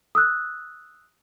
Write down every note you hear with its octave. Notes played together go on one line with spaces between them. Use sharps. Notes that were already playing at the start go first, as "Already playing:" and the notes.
D#6 E6 F#6